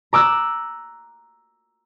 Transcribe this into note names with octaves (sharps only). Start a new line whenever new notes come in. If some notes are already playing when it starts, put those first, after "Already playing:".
A#5 D6 E6 F#6